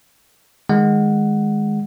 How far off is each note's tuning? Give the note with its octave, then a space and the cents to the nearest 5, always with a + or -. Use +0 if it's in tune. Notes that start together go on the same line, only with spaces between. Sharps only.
D#3 +0 G#3 +0 F#5 +0